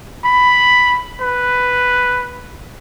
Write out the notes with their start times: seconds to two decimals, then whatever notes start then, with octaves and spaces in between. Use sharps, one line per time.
0.25 B5
1.21 B4